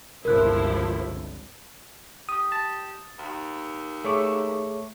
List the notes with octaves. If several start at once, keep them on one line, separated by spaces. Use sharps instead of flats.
G1 C#2 C3 F3 E4 A#4 F#6
G4 D#6
A5
D#2
A3 G#4 C#5 D6